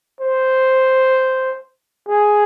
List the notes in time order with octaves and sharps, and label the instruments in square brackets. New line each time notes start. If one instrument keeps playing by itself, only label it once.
[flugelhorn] C5
G#4